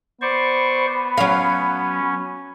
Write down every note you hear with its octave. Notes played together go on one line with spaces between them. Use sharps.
B3 C5 D5 C#6
F#3 C#4 F5